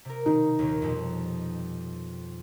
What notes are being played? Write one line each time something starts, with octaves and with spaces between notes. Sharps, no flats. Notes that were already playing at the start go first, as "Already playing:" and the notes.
C3 A#4
B2 D#3 D#4
D#2 A#2 D#3
F2 B2 G3